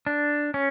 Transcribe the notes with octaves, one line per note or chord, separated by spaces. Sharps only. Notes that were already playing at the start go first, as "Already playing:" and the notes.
D4
C#4